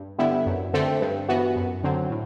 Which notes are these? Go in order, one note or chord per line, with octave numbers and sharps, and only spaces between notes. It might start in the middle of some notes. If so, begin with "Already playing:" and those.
Already playing: G2
D3 G3 B3 E4
F#2
D3 A3 C4
G2
E3 B3 F#4
F#2
D3 F#3 C4
A2